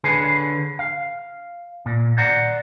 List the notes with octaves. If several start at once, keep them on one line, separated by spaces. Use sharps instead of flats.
D3 G#4 B4 C#5 G#5
F5
A#2
C5 D5 F#5 A#5